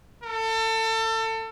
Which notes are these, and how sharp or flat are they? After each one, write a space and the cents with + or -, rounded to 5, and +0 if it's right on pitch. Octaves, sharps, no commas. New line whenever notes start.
A4 +30